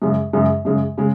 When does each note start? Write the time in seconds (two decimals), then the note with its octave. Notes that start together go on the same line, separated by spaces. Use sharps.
0.02 F#2 C#3 G#3
0.33 F#2 C#3 G#3
0.65 F#2 C#3 G#3
0.97 C#3 G#3